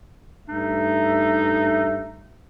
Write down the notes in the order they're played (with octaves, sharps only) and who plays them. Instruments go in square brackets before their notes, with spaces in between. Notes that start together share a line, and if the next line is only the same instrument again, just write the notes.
[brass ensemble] G2 A3 E5 [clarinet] D#4